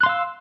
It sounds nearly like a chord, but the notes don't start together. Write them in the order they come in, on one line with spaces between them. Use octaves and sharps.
F#6 C6 F5 E6